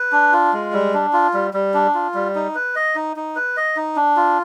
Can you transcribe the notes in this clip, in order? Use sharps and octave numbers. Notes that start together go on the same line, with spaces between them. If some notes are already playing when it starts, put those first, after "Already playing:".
Already playing: B4
D4
F4
G#3
G3
D4
F4
G3
G3
D4
F4
G3
D#4
B4
D#5
D#4
D#4
B4
D#5
D#4
D4
F4